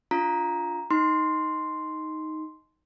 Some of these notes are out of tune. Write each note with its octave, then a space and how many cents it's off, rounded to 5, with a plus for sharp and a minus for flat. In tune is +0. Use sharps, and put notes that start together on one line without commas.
D4 -30 F4 +0 A#5 +5
D#4 +5 C6 +0